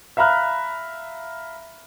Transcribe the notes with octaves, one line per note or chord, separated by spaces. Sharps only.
E5 F5 A#5 B5 F6 F#6